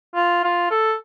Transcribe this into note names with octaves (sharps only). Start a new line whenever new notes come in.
F4
F4
A4